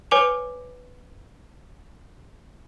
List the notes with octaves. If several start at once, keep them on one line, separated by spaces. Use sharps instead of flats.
B4 C#5 G#5 D6 C#7 F7